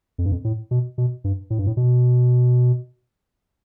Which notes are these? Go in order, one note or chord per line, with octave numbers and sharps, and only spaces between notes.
F2
G2
F2
A2
B2
B2
G2
A2
G2
A2
B2